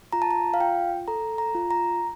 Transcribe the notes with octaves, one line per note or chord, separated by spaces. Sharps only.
F4 A#5
A5
A#5
F5
F4 G5
A4 A#5
A#5
F4
A#5